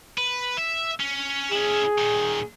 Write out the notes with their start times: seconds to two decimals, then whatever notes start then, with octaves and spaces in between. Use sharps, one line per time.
0.18 B4
0.57 E5
1.00 C#4
1.52 C#4 E4 G#4
1.98 A#2 D#3